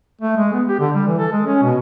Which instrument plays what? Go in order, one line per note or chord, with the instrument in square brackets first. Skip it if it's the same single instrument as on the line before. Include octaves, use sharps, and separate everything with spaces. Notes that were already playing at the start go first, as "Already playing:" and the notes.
[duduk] A3
G#3
B3
G4
D3
G3
E3
A4
G#3
C#4
B2